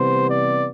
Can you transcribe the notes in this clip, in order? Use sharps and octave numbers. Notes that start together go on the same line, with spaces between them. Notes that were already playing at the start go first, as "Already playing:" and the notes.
Already playing: C3 E3 G3 B3 C5
D5